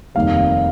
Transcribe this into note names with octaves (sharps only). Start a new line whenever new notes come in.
F1 D#2 D#3 G3 F5